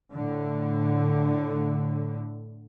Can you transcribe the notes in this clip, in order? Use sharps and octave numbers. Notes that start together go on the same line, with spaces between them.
A2 D3